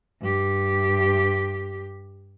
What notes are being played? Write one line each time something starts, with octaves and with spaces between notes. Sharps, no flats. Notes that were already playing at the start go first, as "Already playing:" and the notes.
G2 G4